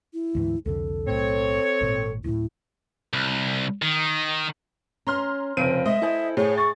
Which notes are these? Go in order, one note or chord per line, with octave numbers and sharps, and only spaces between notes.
E4
D2 G#2 E3
C2 F2 D3 A4
B1 A2 C4 C#5
G#1 A#2
D1 A2 E4
C2
D#3
C#4 A#5 C6 F6
F1 C#3 F3 C4 D7 D#7
G#3 C5 D#5 E5
E4 A4 C5 G#5
A2 G#4 C#5
C#6 A6